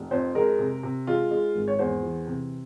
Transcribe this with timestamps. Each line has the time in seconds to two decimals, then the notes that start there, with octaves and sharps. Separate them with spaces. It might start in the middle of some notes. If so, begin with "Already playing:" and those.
Already playing: F1
0.11 F2 C5
0.35 G#3 A#4
0.59 C3
0.83 C3
1.07 G#3 F4
1.31 G#3
1.55 G#1
1.68 C#5
1.79 E2 C5
2.02 E3
2.27 C3